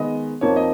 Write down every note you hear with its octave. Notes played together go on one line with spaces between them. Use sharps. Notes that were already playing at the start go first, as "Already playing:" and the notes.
Already playing: D#3 G#3 B3 D#5
F2 F3 A#3 D#4 C#5
D#5